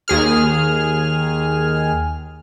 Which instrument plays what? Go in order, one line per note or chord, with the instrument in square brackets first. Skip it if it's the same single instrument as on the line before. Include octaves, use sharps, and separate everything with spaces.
[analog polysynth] D#2 G#4 F6